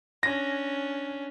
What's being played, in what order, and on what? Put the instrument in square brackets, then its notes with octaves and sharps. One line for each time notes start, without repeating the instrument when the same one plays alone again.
[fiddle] C#4 D4 [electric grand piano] A#6